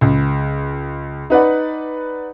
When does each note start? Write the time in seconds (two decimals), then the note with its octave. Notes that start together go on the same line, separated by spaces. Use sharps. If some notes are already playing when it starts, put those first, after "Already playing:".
0.01 C#2
1.30 D#4 B4 D5 F#5